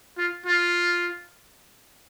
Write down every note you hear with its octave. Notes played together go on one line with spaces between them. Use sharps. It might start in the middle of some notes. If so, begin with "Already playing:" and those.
F4
F4